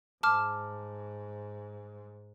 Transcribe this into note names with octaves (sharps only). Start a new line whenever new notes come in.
G#2 A5 D6 F6